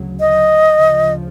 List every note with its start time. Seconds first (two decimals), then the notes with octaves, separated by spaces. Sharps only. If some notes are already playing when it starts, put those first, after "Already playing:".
Already playing: D2 C#3 F#3
0.20 D#5
0.73 D2 C#3 F3